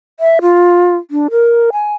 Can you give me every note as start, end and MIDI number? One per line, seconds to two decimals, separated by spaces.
0.20 0.39 76
0.41 0.96 65
1.11 1.28 62
1.31 1.70 70
1.73 1.94 80